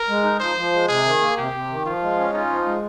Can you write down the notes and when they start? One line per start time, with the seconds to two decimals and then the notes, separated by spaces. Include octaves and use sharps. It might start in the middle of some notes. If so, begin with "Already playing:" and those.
Already playing: A#4
0.08 G#3
0.23 D#4
0.40 F3 C5
0.56 F3
0.72 G#3
0.88 C3 G#4
1.05 D#3
1.21 A#3
1.37 C3 G4
1.53 C3
1.69 D#3
1.85 F3 F4
2.01 G#3
2.17 C#4
2.33 D#4 F4
2.50 F3
2.66 G#3